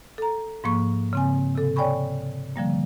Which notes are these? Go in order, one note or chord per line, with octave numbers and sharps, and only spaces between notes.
A4 A#5
G#2 F3 A#3 C#6
C#3 C4 G#5
C3 A4
C#5 D5 G5 G#5 B5 C#6
D3 F3 G3 A#3